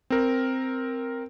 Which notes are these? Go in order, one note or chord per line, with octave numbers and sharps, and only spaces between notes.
C4 A#4